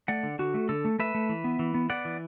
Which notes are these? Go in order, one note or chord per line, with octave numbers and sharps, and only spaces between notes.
A3 D5 F#5
D3
D3 F#4
A3
D3 A4
A3
A3 B4 E5
A3
E3
B3
E3
B3
B3 D5 F#5
E3